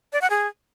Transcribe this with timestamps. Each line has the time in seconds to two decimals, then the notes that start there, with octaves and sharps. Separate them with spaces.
0.13 D5
0.22 F#5
0.30 G#4